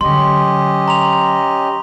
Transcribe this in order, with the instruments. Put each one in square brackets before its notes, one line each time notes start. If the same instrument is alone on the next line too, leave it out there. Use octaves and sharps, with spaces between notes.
[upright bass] D3 F#3 [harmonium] C#4 G4 D#5 [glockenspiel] C6
[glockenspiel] A#5 C6 F7